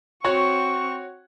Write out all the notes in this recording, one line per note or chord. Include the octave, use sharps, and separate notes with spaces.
C4 F#4 C#5 F#5 C#6